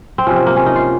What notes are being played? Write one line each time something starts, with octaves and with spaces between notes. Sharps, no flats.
C4
C3 F3 C#4
C4
A#3
C#4
D#4
F4